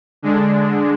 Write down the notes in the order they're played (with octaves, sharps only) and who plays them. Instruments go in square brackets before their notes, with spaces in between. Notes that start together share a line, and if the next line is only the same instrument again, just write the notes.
[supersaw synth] D3 G#3 D4